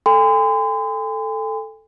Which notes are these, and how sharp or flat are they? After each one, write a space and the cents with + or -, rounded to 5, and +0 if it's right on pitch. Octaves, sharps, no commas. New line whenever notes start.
A4 +0 G#5 -45 C6 -40